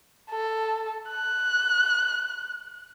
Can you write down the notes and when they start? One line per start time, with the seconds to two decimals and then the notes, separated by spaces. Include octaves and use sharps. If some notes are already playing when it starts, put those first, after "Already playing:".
0.31 A4
1.11 F#6